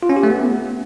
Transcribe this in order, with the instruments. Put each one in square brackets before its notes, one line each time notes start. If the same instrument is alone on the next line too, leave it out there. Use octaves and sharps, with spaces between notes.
[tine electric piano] F4
C#4
G4
A3
B3